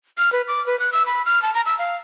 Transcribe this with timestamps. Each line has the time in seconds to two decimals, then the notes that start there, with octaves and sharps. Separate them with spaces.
0.18 F6
0.33 B4
0.48 D6
0.67 B4
0.80 F#6
0.93 E6
1.06 B5
1.26 F6
1.42 A5
1.54 A#5
1.66 E6
1.79 F5